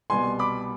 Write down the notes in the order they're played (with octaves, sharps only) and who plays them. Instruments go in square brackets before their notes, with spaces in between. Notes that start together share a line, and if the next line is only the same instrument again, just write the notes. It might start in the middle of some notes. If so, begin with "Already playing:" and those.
[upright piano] C2 B2 G3 B3 G#5 C6
B5 D6